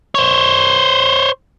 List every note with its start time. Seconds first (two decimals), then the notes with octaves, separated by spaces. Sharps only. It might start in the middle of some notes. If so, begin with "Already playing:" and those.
0.15 C5 C#5